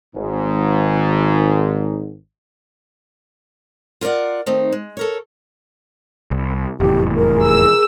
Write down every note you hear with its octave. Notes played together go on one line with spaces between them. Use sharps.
G#1 G#2
F4 A#4 C#5 D5 F#5
D#3 A3 C4 D#4
G#3
A4 A#4 C#5
C2
F1 E2 A2 G4
G#4 A#4
E6